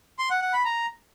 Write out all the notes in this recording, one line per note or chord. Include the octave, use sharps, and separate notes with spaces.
C6
F#5
F#5
B5
A#5